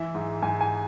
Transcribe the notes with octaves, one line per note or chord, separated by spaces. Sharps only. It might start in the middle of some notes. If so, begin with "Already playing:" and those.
Already playing: E3 E5
G#2
G#2 G#5
G#5